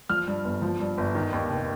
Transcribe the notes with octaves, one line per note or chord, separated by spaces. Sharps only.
F3 F6
G2
G1
F3
G2
G1
D#3
D#2
F1